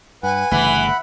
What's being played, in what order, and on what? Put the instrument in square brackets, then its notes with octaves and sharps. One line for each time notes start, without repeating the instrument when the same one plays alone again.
[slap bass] G2 [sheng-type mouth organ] B4 F#5 [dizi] G#5
[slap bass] G1 C#3 A3 [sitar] E3 [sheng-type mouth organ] F#5 B5